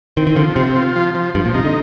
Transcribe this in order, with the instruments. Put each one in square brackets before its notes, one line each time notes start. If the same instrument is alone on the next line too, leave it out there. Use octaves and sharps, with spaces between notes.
[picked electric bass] D#3 [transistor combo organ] C4
[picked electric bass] D#3
[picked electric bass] D3 [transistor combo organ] F3
[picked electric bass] C3 [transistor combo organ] C4
[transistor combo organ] F4
F3
F3
[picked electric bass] G2 [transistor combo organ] F3
[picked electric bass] A#2
[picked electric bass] C3 [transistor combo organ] D#4
[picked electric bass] D3